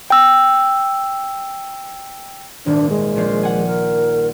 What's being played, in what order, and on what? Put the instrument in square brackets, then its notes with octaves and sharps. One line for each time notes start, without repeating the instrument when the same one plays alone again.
[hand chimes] G5 E6
[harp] D#1 G#1 [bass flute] D4
[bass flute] G#3
[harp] A#1 F3 C7
F#5 G#5
[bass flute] A#4